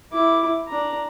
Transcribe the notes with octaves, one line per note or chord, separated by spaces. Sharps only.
E4 D6
D4 A#5